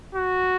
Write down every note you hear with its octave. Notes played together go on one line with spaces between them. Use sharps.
F#4